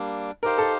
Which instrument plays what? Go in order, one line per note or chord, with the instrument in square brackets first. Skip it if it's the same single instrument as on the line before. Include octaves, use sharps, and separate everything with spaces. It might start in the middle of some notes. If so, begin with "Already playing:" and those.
Already playing: [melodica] G3 A#3 D4
[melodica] D#4 G4 C5 F5 [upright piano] A#4
[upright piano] A4